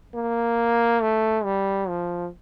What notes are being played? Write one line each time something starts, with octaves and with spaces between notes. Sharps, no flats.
A#3
A3
G3
F3